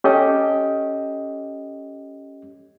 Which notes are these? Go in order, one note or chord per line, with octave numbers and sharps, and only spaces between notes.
C#4 G4 A4 D#5